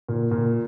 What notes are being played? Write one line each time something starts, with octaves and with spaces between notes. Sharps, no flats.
A#2
A#2